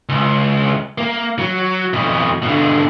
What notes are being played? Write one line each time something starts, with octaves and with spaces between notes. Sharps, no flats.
C#2
A#3
F#3
F2 B2
B2 D3